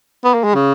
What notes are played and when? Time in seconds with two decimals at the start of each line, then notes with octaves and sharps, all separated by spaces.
0.24 B3
0.34 A#3
0.44 G#3
0.54 C#3